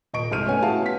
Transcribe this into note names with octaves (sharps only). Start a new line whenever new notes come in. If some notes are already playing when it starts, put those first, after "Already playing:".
D#1 D#5 C#6 D7
C2 G#2 F6 D#7
A3 B3 C#4 C#5 G#5
E4 F#4 G#4 F5 A5
B3 B6